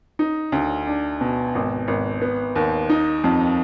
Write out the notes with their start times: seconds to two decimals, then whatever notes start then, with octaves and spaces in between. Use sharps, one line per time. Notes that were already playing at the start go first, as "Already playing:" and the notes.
0.19 D#4
0.52 D2
0.87 D4
1.21 B2
1.55 G#1
1.88 G#1
2.22 B3
2.56 D#2
2.90 D#4
3.24 F2